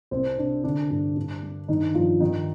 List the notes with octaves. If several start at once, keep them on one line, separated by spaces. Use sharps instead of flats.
C2 C4 C5
C3 D4
D3 D4
G2
G2
G3
G2 D#3 D#4
G2 F3 F4
D#3 D#4